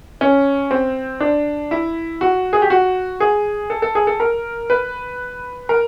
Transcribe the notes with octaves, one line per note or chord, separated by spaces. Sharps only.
C#4
C4
D4
E4
F#4
G#4
G4
F#4
G#4
A4
A4
G#4
A4
A#4
B4
A#4